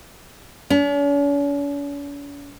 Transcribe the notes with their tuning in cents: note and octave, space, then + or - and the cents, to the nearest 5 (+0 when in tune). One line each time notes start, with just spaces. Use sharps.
C#4 +45